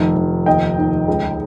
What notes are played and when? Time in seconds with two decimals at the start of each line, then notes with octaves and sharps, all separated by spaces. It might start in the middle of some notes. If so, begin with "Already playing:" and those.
Already playing: F1 D#3
0.16 F1
0.46 D#2 D#5 G5
0.78 D#2
1.08 C#2